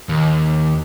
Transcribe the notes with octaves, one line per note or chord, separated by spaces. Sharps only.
D#2